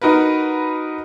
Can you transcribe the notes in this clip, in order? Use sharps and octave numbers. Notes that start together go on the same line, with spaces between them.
D#4 F#4 A#4 B4